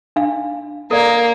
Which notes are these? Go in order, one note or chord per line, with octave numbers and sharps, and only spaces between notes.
D4 F5
A#3 A4 D5 F5